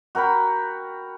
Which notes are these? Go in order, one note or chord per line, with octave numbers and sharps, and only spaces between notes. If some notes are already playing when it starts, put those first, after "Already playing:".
F#4 A#4 G5 B5